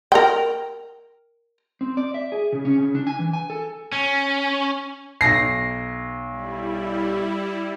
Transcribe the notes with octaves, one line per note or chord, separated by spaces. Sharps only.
A#4 G5
C4
D5
E5
G#4
C#3
C#4
C#3
D4
G#5
E3
G#5
A4
C#4
B1 A#6 C7
G3 E4